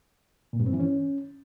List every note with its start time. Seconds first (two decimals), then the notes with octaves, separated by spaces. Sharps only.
0.53 A#2
0.60 G2
0.66 C4
0.73 E3
0.80 C#4